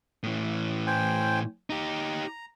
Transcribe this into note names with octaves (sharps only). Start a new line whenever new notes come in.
A2 E3
C5 G5 G#5
D#4 G4 A#5